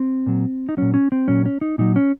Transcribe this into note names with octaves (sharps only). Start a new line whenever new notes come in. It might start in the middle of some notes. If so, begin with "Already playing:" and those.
Already playing: C4
A#2 F#3
D#4
A#2 F#3 C#4
C#4
C4
A#2 F#3 C#4
C#4
D#4
A#2 F#3 D#4
C#4